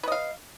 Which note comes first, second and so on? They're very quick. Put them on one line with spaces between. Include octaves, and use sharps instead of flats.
B4 D#5 F5